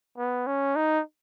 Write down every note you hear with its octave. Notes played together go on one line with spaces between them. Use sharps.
B3
C#4
D#4